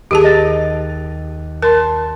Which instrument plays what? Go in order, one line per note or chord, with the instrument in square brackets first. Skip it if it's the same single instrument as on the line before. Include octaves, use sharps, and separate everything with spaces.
[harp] D#2 [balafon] G4 G#4 A5
[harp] D#5 A6
[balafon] A#4 [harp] A5 C6